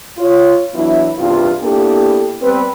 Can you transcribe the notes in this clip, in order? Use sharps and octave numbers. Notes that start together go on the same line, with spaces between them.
F4 C#5
E3 F#3 B3 D4 E4
E2 G2 C3 F4
A#3 B3 D4 E4 G4 A4
G3 B3 C4 B4